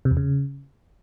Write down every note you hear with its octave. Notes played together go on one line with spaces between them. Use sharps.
C3
E2
C#3